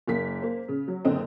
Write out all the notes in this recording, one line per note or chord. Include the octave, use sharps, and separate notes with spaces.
F#1 A#3 B6
A#3 C5
C#3
F#3
F#1 D3 C4 D#5